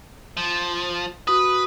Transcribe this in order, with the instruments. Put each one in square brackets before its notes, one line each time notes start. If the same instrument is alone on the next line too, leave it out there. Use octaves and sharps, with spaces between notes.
[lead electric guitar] F3
[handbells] F#4 D#6 [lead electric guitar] B4